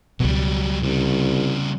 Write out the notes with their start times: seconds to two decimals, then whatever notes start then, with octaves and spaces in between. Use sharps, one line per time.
0.20 C#2 B2 F#3 G3
0.82 C2 C#3 G3